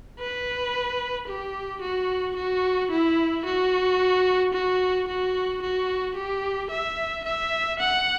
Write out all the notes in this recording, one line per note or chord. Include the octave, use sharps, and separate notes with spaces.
B4
G4
F#4
F#4
E4
F#4
F#4
F#4
F#4
G4
E5
E5
F#5